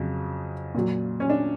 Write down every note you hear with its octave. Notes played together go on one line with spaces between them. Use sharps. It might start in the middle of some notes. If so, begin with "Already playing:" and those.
Already playing: F2 C#3 F#3
A#2 F#3
C#4
D4